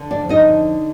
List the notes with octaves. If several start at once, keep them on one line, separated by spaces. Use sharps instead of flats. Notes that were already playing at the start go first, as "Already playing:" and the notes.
Already playing: D3
D4 D5
F2
D#4 D#5
D3